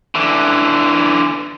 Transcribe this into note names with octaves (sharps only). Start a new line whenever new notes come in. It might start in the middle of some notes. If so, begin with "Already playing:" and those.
D3 E3